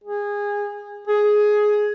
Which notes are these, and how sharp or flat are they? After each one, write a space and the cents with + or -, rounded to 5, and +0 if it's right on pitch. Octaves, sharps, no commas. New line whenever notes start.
G#4 -20
G#4 +10